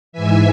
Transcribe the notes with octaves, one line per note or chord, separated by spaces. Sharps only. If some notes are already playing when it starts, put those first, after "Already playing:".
G#2 E3 E5 G#5